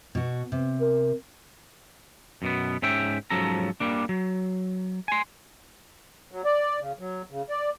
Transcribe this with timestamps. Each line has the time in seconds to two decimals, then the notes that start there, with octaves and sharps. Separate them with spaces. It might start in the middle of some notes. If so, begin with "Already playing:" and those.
0.15 B2 F#4
0.52 C3
0.81 A#4
2.42 F#2 B2 B3
2.82 G#2 C#4 E5 G5
3.30 G#2 F3 F#3 C#4 A4 A#5
3.80 G3 A#3 D4
4.09 F#3
5.08 G#5 C6
6.32 F#3
6.45 D5
6.80 C#3
6.99 F#3
7.31 C#3
7.49 D5